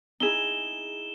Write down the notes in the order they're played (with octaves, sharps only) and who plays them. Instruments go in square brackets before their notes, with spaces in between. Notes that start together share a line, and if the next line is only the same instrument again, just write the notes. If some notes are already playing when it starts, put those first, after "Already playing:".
[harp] D#4 E4 G#4 [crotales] E7 G7